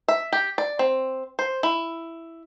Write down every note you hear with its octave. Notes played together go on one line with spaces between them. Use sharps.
E5
G4
D5
C4
C5
E4